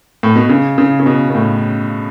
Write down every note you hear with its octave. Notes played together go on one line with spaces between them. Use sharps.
A2
B2
C#3
C#3
C#3
B2
B2
A2